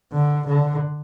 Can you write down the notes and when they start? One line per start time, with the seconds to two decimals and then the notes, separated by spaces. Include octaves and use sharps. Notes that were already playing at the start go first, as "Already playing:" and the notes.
0.13 D3
0.46 D3